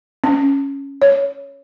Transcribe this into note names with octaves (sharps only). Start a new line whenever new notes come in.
C#4
C#5